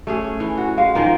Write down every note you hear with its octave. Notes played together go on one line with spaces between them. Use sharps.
A3 C#4 G#4
E3
F#4
G#3 F5
D#3 F3 A#3